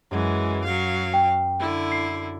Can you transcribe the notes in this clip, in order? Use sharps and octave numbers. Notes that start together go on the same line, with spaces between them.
F#2 E3 G#3 F#5 G#6
F#3 F5
G5
D3 E4
C7